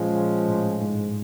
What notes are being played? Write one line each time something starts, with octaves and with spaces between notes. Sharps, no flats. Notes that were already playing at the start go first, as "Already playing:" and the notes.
Already playing: A#2 F3 G#3 C#4 F4
A2
G#2